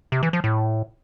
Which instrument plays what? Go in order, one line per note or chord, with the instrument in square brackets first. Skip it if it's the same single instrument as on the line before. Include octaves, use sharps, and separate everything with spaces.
[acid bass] C3
E3
F3
A2